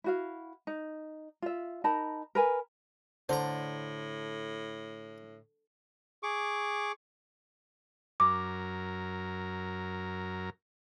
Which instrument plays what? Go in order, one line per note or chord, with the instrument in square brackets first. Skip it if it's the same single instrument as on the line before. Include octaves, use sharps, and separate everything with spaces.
[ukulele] E4 F#4 F5
D#4
F4 E5
D#4 A#4 A5 B5
A#4 B4 G#5
[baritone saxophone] A2 [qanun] D3 [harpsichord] C5 A#5
[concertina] G#4 C#6 D6
[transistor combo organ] F#2 A#4 [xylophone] D6